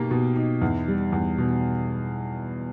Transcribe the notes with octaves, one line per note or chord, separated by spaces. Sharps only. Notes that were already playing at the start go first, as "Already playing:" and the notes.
Already playing: B2 A#3 D#4 G4
B2
D#4
E2
G3
E2
B2